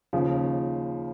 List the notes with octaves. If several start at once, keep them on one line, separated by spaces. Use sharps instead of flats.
D#2 C#3 F3